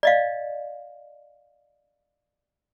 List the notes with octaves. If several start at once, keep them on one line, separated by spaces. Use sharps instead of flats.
D5 D#5 F5